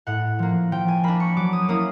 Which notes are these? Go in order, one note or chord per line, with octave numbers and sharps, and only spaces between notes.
A2 F#5
F3 A#3
F3 G5
G#5
A#3 D4 B5
C#6
F#3 D6
D#6
A#3 C#4 E4 D#6